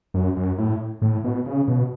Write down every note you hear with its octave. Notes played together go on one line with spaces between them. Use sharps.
F#2
F#2
A2
A2
B2
C#3
B2